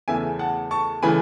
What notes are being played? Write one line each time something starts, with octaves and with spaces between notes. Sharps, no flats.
E2 C#3 E3 A3 E5 G#5
F#5 A5
A5 C#6
C#3 E3 A3 G#5 B5